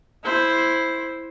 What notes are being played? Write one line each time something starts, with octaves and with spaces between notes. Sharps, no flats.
E4 C5